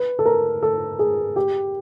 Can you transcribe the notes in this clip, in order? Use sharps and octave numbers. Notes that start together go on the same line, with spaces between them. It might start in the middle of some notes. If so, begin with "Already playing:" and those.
Already playing: B4
A4
A#4
A4
G#4
G4